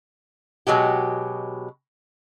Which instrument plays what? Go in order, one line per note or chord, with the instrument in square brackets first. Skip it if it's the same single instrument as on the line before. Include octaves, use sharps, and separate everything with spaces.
[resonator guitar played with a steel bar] B2 F#3 G#3 G4